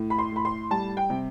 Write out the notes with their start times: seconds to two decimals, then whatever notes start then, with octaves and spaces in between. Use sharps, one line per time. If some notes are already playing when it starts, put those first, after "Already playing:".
Already playing: A2
0.10 B5
0.18 C6
0.32 A2 B5
0.45 C6
0.70 G3 A5
0.97 G5
1.10 C3